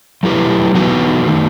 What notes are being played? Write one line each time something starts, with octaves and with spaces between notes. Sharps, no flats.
F#3 A3 E4 G4 B4
E3 B3 D#4 F#4 B4
D#3 A3 D#4